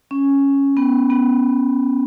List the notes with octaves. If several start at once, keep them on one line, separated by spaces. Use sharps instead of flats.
C#4
B3
B3